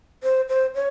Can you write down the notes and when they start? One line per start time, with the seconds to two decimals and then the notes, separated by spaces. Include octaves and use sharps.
0.23 C5
0.49 C5
0.75 C#5